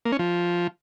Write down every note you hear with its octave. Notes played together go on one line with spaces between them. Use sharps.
A#3
C#4
F3